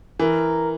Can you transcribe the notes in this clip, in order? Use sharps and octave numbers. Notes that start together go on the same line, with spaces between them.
E3 A#4